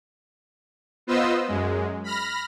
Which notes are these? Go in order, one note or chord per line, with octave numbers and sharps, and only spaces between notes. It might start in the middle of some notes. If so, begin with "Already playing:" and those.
B3 F4 B4 C5 D#5 E6
F#2 G#3
B5 F6 A#6